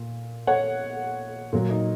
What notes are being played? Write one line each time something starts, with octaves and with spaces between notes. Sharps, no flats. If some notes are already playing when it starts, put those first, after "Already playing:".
Already playing: A#2
C#5 F#5
A#2 F#3
D#4